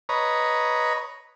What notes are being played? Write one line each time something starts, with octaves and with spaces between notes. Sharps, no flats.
B4 C#5 D#5 A#5